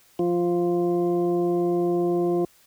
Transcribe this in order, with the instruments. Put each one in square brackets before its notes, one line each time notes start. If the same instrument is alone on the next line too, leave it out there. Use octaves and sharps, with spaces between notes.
[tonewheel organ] F3 F4